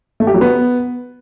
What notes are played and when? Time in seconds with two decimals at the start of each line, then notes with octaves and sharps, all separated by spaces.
0.20 A3
0.27 G4
0.34 F#3
0.41 B3